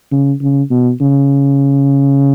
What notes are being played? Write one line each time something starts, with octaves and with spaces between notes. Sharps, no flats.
C#3
C#3
B2
C#3